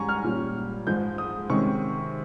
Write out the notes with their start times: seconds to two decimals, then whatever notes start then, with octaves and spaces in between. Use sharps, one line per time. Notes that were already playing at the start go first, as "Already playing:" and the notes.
Already playing: G#2 G3 C#4 G#5 A#5 C#6
0.09 F6
0.24 A#2 G3 C#4
0.87 G#2 F3 G#3 G6
1.18 D#6
1.50 C3 D#3 G#3 C#4 C#6